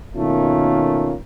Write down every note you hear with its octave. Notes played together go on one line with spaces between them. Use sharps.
B2 D#3 A3 A#3 C#4 F4